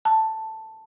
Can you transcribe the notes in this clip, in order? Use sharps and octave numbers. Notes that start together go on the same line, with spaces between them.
A5